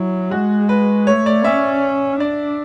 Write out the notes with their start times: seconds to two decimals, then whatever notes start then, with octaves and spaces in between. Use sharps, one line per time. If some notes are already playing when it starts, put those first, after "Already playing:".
Already playing: F#3 E4
0.31 G#3 F#4
0.69 B4
1.07 A3 C#5
1.26 D5
1.44 C#4 E5
2.20 D4 D5